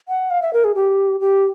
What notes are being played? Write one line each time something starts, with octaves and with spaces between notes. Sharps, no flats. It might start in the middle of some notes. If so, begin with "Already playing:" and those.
F#5
F5
E5
A#4
G#4
G4
G4